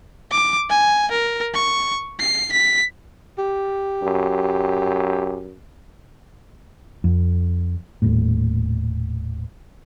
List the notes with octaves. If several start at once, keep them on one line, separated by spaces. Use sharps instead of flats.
D6
G#5
A#4
C#6
C7
B6
G4
F#2
F2
D#1 A2